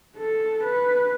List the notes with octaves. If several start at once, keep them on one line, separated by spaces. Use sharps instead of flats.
A4
B4